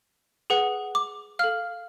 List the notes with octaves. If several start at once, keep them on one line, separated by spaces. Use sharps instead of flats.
G#4 B4 F#5
D6
A4 F5 F6